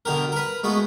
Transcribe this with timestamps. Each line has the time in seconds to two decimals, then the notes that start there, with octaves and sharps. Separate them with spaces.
0.05 B2 D3 G4 A#4
0.32 A#4 B4
0.64 G#3 A3 B3 F#4